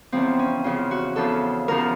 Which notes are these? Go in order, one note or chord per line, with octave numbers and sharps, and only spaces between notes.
E2 C#3 F3 C4
C#4
E2 C#3 F3 F4
F#4
E2 C#3 F3 A4
E2 C#3 F3 A#4